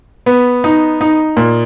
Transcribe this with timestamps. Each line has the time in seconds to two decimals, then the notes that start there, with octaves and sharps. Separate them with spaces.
0.26 B3
0.64 D#4
1.01 D#4
1.37 A#2